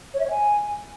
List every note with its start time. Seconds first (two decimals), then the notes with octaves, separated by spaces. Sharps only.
0.14 C#5
0.19 E5
0.25 C#5
0.30 G#5